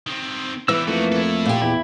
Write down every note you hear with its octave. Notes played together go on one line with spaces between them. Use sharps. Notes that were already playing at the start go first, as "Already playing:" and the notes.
D#3 C4
E3 G3 B3 E4 E6
F2 A3 A#3 D#4 F#4
E4 A4
A#2 G4
E2 E4